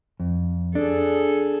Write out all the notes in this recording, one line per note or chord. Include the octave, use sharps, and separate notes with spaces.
F2
D4 G#4 A4